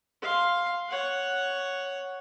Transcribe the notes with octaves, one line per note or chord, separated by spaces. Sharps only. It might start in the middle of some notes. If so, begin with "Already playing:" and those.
F5 C6
C#5 F#5